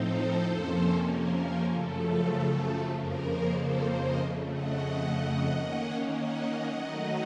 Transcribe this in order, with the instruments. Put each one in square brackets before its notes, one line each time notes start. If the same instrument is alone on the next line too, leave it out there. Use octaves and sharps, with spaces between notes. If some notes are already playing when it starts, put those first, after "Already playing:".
Already playing: [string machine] A2 F3 C4 D#4 A4 C5
F2 C3 F3 A#3 C#4
A#4
F#2 C#3 F3 A3 A4
F2 C#3 F3 A#3 A#4
A4 C5
C5 D#5
F2 C#3 A3
D#5 F#5
D#3 A#3 C#4
D#5 F#5
D#3 F#3 A3 D#4